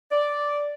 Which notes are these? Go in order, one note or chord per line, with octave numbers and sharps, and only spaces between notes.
D5